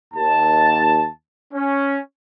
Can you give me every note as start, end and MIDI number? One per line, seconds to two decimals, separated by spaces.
0.14 1.08 39
0.14 1.08 81
1.53 1.98 61